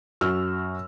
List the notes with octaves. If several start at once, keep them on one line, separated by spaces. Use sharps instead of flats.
F#2 F#4 E6 F6